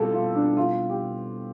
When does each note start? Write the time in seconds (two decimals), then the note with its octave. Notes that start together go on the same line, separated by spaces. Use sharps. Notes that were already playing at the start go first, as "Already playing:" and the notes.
Already playing: B2 G3 C4 E4 F4 G4 A4
0.13 F4
0.35 D4
0.57 F4
0.90 G4